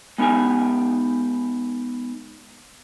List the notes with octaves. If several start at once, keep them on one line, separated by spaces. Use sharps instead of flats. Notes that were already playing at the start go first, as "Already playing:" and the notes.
G#3 B3 D#4 G4 G#5